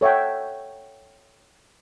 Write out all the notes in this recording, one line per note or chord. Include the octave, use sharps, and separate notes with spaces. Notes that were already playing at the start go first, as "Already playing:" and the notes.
A4 C#5 E5 F#5 G5